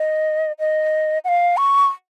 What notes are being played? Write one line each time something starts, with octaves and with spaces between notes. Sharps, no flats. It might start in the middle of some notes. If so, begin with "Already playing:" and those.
Already playing: D#5
D#5
F#5
F5
C#6